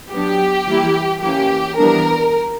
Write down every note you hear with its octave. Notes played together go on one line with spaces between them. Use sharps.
F#3 B3 D4 G4
E3 G3 A#3 E4
E3 A#3 C#4 G4
E3 G3 B3 D4 A#4